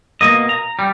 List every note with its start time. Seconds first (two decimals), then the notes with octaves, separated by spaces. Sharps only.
0.21 B2 A#3 D#5
0.49 A#5
0.79 G3